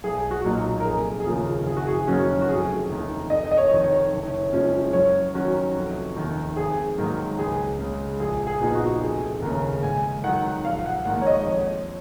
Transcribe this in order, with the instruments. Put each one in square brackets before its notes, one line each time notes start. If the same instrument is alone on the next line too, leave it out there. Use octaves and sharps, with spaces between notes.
[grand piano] B1 [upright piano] G#4
[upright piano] F#4
[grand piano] A#2 F#3 A#3 D#4
[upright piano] A#4
[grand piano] F1 [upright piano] G#4
[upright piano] G#4
[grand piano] D#2 C#3 F3 [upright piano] A#4
[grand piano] F#1 [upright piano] G#4
[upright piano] F#4
G#4
[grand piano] F#2 D#3 A#3 C#4 [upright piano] F#4
[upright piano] F#4
[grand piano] F1 [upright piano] G#4
[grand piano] D#2 D#3 A#3
[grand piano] F1 [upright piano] D#5
[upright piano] D#5
C#5
[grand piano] F2 D#3
[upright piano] C#5
[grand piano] F#1
F2 F3 G#3 C#4
[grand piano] F#2 [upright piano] C#5
[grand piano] D#3 F#3 C#4 [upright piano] F#4
[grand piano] F1
D#2 D#3
[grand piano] G#1 [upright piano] G#4
[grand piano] G#2 D#3 F#3 A#3
[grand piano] C#2 [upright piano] G#4
[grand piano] C#3 G#3
[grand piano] A#1 [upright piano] G#4
[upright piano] G#4
[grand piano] A#2 F3 B3 D#4
[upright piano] F#4
[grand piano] F1 [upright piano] G#4
[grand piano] D#2 C#3 [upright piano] A#4
[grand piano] G#2 [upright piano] G#5
[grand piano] D#3 F#3 [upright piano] F#5
[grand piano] A#1 [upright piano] F5
[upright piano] F#5
[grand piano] G#2 D#3 A#3 [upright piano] F#5
[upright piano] C#5
D#5
[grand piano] F2 [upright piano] C#5